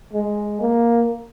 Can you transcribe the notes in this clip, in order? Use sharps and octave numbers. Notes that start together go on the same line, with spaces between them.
G#3
A#3